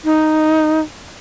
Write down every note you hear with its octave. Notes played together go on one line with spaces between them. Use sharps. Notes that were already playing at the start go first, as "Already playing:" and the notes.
D#4